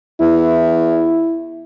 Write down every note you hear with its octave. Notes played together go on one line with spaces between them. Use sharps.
E2 E4